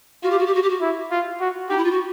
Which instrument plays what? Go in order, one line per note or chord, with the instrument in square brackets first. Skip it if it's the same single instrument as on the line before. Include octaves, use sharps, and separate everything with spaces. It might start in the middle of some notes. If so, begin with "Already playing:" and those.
[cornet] F4 [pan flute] F#4
[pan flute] G4
F#4
G4
F#4
G4
F#4
[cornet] E4
F4
F#4
[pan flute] D#4 [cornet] G4
[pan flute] E4
F4
F#4